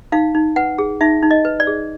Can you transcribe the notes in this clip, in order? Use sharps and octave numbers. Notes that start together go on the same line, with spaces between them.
D#4 F5
D#4
B4 F#5
G#4
D#4 E5
D#4
D#5
B4
D5
G#4